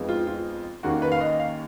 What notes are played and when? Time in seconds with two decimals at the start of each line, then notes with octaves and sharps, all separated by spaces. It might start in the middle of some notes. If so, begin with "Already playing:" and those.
Already playing: F2 F3 G#3 B3 D#4
0.09 F4
0.27 F4
0.83 D#2 D#3 A#3 C#4 F#4
1.02 B4
1.12 F5
1.21 D#5
1.39 F5